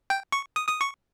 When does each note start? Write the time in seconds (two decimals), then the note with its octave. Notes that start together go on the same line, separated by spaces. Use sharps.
0.10 G5
0.32 C#6
0.56 D#6
0.68 D#6
0.81 C#6